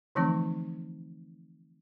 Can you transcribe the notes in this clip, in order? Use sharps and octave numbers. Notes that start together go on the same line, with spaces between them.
D3 E3 F3 A3 C4 D#4